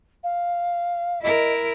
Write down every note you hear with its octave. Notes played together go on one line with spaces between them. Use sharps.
F5
E4 A#4 D#5